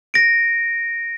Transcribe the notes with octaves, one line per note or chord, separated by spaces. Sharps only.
A#6 D7